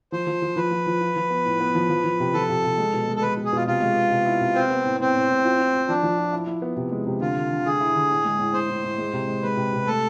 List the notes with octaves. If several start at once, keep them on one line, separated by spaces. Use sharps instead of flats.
F3 C5
F3
F3
F3 B4
F3
F3
F4
F3
B3
A2
B3
F3
F3
F3
C3
F3 A4
C3
C3
G#3
B2
G#3
A4
G#3 B4
B2
G#4
B2 F4
C3 F4
G#3
B3
C3
E4
C3
B3 C4
B3
A2
A2 C4
A2
A2
F4
F4
F4
F3 D4
F3
F4
E4
E4
B3
C3
G#3
C3
D3 F4
D3
D3
D3 G#4
E4
D3
A2
G#3
A2
A2 C5
A2
A2
G#3
C3
G#3
G#3 B4
C3
C3
A3 A4